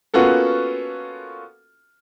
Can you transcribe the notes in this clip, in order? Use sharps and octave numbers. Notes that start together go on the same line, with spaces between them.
A#3 B3 C#4 F4 F#4 A4